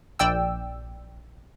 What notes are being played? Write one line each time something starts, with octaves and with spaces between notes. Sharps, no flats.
A#1 D5 G5 E6